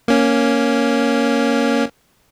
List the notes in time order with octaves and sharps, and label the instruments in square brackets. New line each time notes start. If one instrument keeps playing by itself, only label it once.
[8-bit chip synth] A#3 C#4